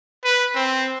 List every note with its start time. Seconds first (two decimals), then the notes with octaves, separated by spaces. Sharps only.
0.24 B4
0.55 C4